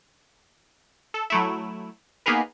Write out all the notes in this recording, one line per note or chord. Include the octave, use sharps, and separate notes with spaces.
A4
F#3 A3 E4
A#3 B3 D#4 G#4 A#4 B4